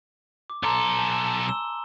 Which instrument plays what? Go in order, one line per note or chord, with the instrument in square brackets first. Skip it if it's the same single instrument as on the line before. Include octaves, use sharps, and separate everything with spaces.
[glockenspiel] D6
[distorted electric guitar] B1 A4 [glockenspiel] A#5 C6 D6
[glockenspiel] G#5 A5
E6 E7 G7